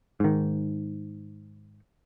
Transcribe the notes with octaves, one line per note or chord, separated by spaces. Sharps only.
G#2 D#3